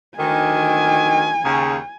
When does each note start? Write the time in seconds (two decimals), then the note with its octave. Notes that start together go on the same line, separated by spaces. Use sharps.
0.18 D2 D#3 G#5
1.44 D#2 C#3